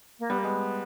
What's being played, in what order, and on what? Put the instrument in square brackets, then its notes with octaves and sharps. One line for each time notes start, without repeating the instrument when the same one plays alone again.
[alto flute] A#3
[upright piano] G3 [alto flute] B3
[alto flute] A#3
[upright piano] G#3 [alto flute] B3